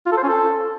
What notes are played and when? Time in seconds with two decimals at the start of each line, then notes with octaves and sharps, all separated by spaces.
0.06 F4
0.12 A4
0.18 C5
0.23 C#4
0.29 A4